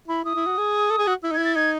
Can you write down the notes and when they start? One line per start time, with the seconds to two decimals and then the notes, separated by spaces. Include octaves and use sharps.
0.08 E4 B5
0.25 E4 D#6
0.36 E4
0.47 F#4
0.58 G#4
0.90 A4
0.98 G#4
1.07 F#4
1.23 E4 E6
1.31 D#4
1.34 E4 G#6
1.45 A6
1.56 D#4 G#6